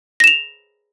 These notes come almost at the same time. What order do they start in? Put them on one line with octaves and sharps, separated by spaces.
A#6 E7 F7